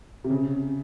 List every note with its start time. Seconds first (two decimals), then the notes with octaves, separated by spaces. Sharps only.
0.24 C3
0.30 C#3